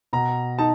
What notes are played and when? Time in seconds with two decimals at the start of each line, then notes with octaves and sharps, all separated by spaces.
0.13 B2 A#5
0.59 D#4 A5